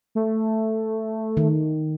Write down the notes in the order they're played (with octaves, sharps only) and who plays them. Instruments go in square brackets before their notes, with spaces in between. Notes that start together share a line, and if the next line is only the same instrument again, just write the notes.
[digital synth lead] A3
[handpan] D#3